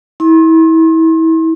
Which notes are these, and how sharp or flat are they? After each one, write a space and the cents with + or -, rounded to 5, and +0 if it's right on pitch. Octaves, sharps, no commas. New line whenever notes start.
E4 -30 C6 +40